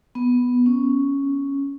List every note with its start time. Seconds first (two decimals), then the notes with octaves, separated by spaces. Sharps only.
0.15 B3
0.66 C#4